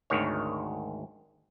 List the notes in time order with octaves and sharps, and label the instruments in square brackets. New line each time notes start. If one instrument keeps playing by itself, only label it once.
[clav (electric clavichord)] G#1 D2 D#3 C#5